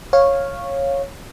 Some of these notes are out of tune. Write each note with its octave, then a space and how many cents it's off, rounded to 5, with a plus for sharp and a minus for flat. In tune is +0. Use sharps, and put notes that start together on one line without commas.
C#5 -10 F5 +0